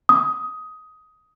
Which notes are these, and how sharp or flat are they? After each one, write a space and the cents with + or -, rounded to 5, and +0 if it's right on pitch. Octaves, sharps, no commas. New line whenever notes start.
D#6 +15